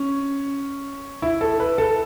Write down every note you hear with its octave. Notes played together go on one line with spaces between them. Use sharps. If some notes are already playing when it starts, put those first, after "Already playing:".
Already playing: C#4
E4
A4
B4
A4